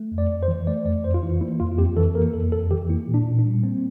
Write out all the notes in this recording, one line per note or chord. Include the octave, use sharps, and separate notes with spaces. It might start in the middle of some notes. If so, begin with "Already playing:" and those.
Already playing: A3
F2
D5
F2
C5
E3
A3 D5
F2 D5
F2 C5
F4
E3 E4
A#3 E4
F2 F4
F4
F2 G4
E3 A4
A#3 A#4
F2 A4
F2 A4
E3 G4
A#3 E4
A#2
D4
A#2
D4
G3
A#3 C4